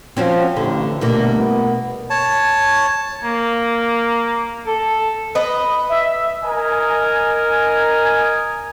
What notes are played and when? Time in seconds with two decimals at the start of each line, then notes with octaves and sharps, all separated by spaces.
0.17 F3 C4 C#4 F#4
0.57 A1 D3
1.01 G1 B2 A3 A#3
1.40 B3
2.10 C#5 A5
3.23 A#3
4.66 A4
5.35 B4 D#5
5.89 E5
6.43 A#4 D#5 G#5